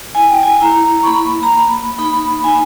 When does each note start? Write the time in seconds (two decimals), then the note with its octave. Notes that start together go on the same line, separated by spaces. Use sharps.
0.15 E4 G#5
0.29 G5
0.43 G#5
0.61 E4 A#5
1.03 C#6
1.06 A#3 B5
1.43 A#5
1.52 A#3 B5
1.99 D#4 B5
2.44 D#4 G#5